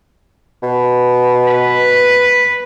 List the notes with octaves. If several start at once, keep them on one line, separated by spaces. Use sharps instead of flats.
B2
B4